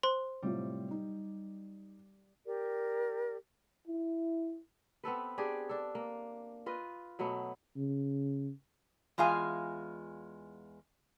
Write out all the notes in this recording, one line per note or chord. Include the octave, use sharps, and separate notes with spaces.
C5 C6
A2 C3 G3 F4
D#4
G4 A#4 D5
E4
B3 C4 A4 B4
D4 G4 G#4 D5
D4 A4
A#3
F4 B4 D#5
B2 F#3 A3 B3
C#3
E2 G#3 F4 F5 G#5